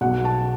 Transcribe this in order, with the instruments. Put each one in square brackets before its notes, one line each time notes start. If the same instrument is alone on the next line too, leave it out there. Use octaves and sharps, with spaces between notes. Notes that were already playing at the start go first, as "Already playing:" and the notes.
[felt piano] B1 B2 F#5
A5